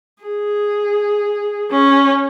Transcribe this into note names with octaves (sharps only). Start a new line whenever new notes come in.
G#4
C#4